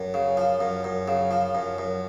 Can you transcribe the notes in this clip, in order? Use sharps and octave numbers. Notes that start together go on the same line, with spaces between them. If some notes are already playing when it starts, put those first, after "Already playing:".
Already playing: F#2
C#3
F3
F#2
F#2
C#3
F3
F#2
F#2